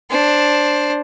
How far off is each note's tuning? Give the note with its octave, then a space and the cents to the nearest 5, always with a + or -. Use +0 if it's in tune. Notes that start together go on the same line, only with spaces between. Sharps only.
D4 +0 C5 +10